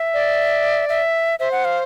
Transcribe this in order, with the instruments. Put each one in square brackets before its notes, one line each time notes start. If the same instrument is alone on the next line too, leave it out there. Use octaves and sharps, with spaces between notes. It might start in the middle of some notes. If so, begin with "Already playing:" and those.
Already playing: [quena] E5
[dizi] D5
[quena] E5
[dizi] C5 [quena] E5
[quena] F#5
F5